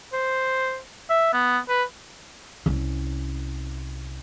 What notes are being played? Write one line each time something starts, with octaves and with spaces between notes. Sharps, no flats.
C5
E5
B3
B4
C2 C#4